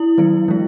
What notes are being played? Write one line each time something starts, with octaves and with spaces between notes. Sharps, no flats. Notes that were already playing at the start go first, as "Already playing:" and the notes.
Already playing: E4
D#3 F#3 B3
E3 G#3